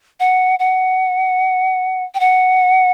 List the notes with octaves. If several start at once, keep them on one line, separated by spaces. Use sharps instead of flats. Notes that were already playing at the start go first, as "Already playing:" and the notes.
F#5
F#5
G5
F#5